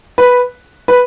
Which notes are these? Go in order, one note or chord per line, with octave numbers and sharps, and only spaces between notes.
B4
B4